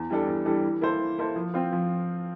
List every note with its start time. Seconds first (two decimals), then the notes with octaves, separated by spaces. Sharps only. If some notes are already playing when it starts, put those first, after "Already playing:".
Already playing: E2
0.10 E3 G3 D4 A4
0.27 E2
0.45 E3 G3 D4 A4
0.63 E3
0.81 A#3 E4 A4 C5
1.00 E3
1.18 A#3 E4 A4 C5
1.36 F3
1.54 C4 F4 C5
1.72 F3